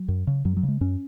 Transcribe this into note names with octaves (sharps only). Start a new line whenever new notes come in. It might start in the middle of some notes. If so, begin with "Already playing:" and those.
Already playing: F#3
F#2
C#3
F#2 F#3
F#3
C#3
G#3
F#2 C#4